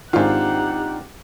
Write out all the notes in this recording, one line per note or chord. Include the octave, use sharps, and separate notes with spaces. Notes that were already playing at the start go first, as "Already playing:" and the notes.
G#2 D#3 C4 D4 D#4 F4 G4 F#5